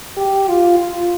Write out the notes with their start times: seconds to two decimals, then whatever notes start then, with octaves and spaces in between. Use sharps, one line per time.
0.17 G4
0.48 F4
0.79 F4